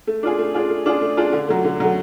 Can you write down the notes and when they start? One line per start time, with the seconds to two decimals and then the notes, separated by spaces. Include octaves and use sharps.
0.07 A3
0.23 D4 F4 G#4
0.38 A3
0.54 D4 F4 G#4
0.70 A3
0.86 D4 F4 G#4
1.01 A3
1.17 D4 F4 G#4
1.33 D3
1.48 F#3 A3
1.64 D3
1.80 F#3 A3